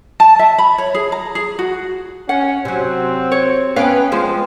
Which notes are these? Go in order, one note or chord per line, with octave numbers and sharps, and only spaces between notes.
A5
E5
B5
C#5
G#4
A#5
G#4
F#4
C#4 F#5
C3 F#3 C4
C#5
B3 C#4 F5 G5
F3 G#3 C4 C5